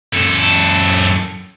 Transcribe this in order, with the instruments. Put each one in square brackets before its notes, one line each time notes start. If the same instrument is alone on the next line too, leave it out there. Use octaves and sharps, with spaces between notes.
[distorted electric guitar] F#2 A4